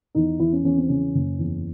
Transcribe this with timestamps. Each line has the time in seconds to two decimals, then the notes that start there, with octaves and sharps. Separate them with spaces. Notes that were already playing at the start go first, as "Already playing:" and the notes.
0.15 E2 D#4
0.39 E2 E4
0.53 C#4
0.64 E2 C#4
0.77 C4
0.89 C#3 C#4
1.14 F#1
1.39 E2